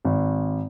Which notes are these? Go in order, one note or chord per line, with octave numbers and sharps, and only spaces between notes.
G#1